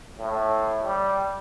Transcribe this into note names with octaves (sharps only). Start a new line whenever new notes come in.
A2
G3